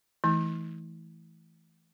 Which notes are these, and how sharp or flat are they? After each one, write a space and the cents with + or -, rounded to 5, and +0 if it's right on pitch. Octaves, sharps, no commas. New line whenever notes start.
E3 +0 A3 -15 E4 -45